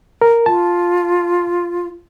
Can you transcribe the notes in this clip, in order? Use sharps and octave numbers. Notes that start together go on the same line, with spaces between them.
A#4
F4 A5